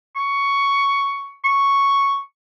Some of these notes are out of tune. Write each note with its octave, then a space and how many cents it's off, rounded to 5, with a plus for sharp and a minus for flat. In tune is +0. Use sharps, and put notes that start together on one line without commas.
C#6 +10
C#6 +0